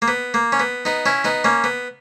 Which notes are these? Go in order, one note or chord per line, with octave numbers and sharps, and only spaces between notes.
A#3
B3
A#3
C#4
B3
B3 D#4
C#4 E4
B3 D#4
A#3 C#4
B3